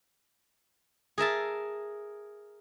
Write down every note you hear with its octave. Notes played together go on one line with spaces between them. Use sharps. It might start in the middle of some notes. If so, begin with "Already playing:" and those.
G#4 A#4 E5 A5